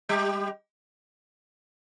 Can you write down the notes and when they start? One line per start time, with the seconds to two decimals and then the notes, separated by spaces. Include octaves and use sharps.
0.09 G3 G4